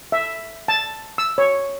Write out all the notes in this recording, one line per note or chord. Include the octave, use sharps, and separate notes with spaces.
E5
A5
E6
C#5